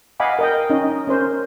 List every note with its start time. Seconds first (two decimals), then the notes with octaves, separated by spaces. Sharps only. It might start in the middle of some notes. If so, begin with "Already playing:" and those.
0.20 D#5 F5 F#5 G#5 B5 D6
0.39 A#4 D#5 G5
0.70 C#4 D#4 D#5
1.07 C#4 A#4 C5